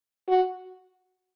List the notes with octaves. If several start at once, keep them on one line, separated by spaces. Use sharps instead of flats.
F#4